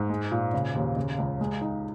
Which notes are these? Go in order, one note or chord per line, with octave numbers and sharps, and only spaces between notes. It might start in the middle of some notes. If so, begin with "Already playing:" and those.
Already playing: G#2
G#3
A#2
C#3
D#2
C#3
C#2
G#3
D#4